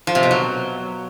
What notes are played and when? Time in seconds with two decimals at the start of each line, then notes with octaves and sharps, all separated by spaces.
0.07 F3
0.15 C3
0.23 B2
0.31 F#3